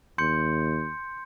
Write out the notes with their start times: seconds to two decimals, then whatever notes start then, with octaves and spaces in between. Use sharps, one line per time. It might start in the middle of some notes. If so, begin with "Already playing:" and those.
0.18 D#2 C6 G6 C#7